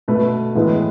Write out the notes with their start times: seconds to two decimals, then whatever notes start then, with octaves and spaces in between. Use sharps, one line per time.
0.08 B2 A3 B4
0.55 A2 E3 G#3 B3